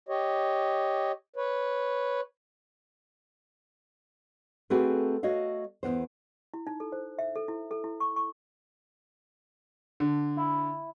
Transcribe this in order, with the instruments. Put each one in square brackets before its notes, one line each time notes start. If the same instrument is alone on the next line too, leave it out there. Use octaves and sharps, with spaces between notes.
[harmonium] G4 C#5 D#5
B4 C#5
[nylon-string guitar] A3 C4 F#4 G#4 A4 B4
A3 F#4 C#5 D#5 F5
E2 C3 B3 C5
[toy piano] E4
D#4
A4
C5
E5
A4
E4
A4
E4
C#6
C#6
[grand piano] D3
[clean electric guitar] E4